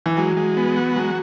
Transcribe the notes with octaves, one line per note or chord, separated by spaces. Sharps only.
E3
F#3 G#3
G#3
B3
F#4
F#3 G#3